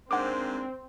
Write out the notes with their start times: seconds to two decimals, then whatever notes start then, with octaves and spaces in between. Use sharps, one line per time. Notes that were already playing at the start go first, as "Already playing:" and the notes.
0.11 G#2 A#3 C4 D4 F#5 D6